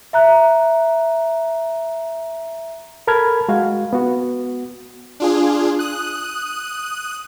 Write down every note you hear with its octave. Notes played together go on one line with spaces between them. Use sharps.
E5 A#5 F#6
A4 A#4 A5 B5 F6 G#6
G#3 F#4 F5
B3 F#4
D4 F4 G#4
D#6 F#6